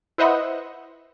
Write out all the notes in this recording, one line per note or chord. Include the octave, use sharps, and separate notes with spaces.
E4 B4 C5 D#5 E5 F#5